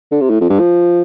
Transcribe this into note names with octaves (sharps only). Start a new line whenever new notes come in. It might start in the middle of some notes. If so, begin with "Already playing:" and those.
D3
C3
A2
F2
G2
F3